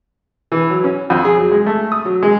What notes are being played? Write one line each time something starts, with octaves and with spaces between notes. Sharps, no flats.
E3
F#3
C#4
F2
G#4
F#3
G#3
A3
D#6
F#3
G#3